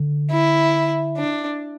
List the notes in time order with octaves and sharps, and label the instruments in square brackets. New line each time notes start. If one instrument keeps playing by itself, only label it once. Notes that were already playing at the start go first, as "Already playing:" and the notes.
Already playing: [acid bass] D3
[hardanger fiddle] E4
D4